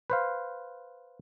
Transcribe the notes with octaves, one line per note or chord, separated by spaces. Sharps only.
B4 C5 F5